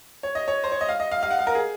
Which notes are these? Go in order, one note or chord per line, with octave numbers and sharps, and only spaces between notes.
C#5
D#5
C#5
C5
C#5
D#5
F5
D#5
F5
F5
F#5
F5
A#4
G#4